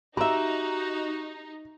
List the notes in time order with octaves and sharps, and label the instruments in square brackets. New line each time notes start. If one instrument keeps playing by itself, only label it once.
[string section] D#4 [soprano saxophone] F#4 [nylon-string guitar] G4 E5 [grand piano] A#5